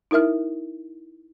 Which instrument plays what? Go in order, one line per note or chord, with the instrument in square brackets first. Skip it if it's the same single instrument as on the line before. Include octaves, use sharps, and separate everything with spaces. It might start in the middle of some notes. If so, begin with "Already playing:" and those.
[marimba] D#4 E4 A#4 E5 F6